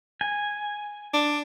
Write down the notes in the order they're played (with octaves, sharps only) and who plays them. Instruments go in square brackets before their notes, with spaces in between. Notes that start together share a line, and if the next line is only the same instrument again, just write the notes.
[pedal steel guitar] G#5
[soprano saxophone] D4